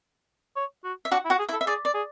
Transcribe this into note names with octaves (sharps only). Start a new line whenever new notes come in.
C#5
F#4
E5
D4 F#4 F#5
E4
F#4 F#5
G#4
E4 E5
A4
E5
G#4 D5
D5
G#4